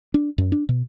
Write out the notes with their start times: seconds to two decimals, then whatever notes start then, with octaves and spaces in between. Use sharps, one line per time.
0.14 D4
0.38 F#2
0.52 D4
0.69 B2